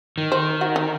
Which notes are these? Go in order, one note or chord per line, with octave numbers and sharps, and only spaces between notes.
D#3
C5
F#4
D#4